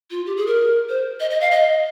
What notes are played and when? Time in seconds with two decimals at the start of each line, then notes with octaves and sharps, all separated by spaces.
0.11 F4
0.26 G4
0.37 G#4
0.47 A#4
0.89 C5
1.20 D#5
1.30 D#5
1.41 F5
1.51 D#5